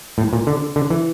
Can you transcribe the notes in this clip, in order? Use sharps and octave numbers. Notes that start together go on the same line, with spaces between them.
A2
A#2
D3
D3
E3